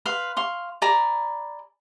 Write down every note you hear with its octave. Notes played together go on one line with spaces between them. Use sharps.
B4 F5 C6
F5 C6 C#6
D5 G#5 A#5 B5